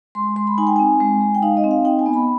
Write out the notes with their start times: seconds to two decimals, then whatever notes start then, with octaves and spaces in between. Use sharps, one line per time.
0.15 G#3 C6
0.36 G#3 C6
0.47 B5
0.58 D#4 G#5
0.67 G5
0.76 C4 G#5
1.00 G#3
1.21 G#3
1.35 G5
1.43 D#4 F5
1.57 D#5
1.64 C4
1.71 F5
1.85 D#4 G5
1.99 G#5
2.06 B3
2.13 B5